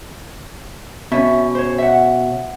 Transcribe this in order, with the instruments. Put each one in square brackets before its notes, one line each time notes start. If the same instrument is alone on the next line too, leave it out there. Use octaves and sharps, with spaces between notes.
[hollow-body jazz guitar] B2 C#4 [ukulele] E5
[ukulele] C5 C#5
E5 F#5